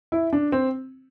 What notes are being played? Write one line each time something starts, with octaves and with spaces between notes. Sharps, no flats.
E4
D4
C4